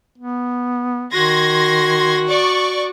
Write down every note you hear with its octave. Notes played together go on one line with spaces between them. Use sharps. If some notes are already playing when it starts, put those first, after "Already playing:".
B3
D#3 F#4 C6 G#6 A#6
D5 C#6